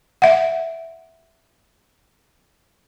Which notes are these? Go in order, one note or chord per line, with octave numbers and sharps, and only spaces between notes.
E5 F#5